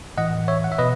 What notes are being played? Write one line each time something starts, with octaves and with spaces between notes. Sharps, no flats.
A2 E3 D#5 F#5
C#5 E5
F#5
E5
B2 B4 D#5